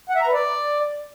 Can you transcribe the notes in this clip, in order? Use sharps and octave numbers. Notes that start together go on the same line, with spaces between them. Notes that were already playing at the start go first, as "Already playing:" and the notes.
F#5
E5
A#5
B4
D5